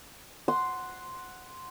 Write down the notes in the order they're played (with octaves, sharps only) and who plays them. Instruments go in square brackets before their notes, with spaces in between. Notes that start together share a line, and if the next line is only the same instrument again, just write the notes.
[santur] F#5 C6